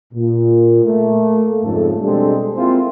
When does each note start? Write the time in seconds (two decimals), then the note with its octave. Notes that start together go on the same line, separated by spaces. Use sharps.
0.13 A#2
0.84 A3 A#3
1.63 F2 G#2 C#3 A3 A4
2.01 B2 G3 G#3 C4 D4 A4
2.55 A#3 C4 E4 F4 G#4 C5